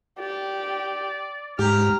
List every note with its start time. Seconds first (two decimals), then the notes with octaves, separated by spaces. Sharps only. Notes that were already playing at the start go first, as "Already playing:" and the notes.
0.19 G4 D5
1.59 G#2 G4 A#5 F6